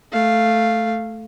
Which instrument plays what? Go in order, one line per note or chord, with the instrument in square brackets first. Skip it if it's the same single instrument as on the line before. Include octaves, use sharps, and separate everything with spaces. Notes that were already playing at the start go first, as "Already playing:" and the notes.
[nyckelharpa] A3 F5